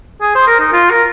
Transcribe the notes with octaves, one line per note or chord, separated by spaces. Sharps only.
G#4
C5
A#4
D#4
F4
A#4